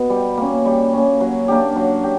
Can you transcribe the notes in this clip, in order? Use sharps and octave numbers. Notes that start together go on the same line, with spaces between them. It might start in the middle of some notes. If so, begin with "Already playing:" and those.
Already playing: B2 B3
G3
A#3 C#4
G3
A#3 C#4
F#3
A#3 D4 G4
F#3
G4